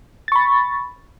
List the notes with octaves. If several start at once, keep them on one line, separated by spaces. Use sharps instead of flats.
B5 C#6 A6